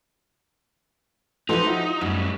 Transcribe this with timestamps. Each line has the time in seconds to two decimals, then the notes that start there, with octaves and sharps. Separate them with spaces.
1.49 E3 F3 D#4 F#4 G4 A4 C6
1.66 E4 F4
2.01 F#2 A2 G3